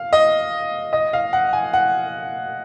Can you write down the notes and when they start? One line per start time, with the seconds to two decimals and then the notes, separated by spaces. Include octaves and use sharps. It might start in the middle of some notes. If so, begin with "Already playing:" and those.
Already playing: F5
0.13 D#5
0.93 D#5
1.13 F5
1.33 F#5
1.53 G#5
1.73 F#5